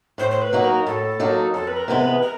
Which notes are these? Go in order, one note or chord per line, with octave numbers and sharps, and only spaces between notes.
A2 C5
C5
B4
F#3 A#3 D#4 F#4
A#4
A2 A4
F#3 A#3 D#4 F#4
F2 A4
B4
A#4
C3 E3 G#3 B3
B4
A#4